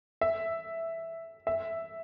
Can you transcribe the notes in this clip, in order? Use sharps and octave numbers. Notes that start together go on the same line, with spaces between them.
E5
E5